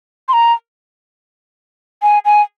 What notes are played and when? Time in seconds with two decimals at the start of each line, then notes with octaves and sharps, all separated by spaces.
0.28 C6
0.33 A#5
2.02 G#5
2.25 G#5